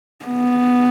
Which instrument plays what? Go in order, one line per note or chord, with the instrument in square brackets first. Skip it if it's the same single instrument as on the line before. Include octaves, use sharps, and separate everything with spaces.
[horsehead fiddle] B3